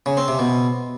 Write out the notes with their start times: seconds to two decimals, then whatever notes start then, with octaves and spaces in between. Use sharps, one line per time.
0.06 C#3
0.17 C4
0.28 C3
0.39 B2